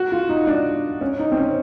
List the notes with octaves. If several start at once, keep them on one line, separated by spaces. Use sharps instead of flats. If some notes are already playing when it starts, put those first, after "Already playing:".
Already playing: F#4
F4
D#4
D4
C#4
D#4
C4
C#4